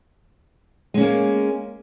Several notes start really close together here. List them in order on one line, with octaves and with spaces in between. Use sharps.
G#3 C#4 A#3